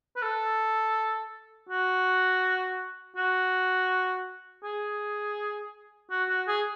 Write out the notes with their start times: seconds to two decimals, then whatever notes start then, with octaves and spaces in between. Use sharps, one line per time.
0.16 B4
0.22 A4
1.69 F#4
3.16 F#4
4.63 G#4
6.11 F#4
6.29 F#4
6.47 G#4